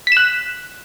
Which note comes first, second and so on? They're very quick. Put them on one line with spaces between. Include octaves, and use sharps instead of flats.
B6 E7 F#6